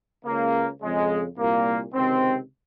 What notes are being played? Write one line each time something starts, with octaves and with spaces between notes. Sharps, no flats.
C#2 C#3 A#3
F2 C#3 G#3
C2 A#2 A#3
C#2 C3 D#3 C4